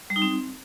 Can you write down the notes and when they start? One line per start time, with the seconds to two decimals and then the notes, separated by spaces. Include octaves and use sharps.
0.10 G3
0.16 D#4
0.22 C4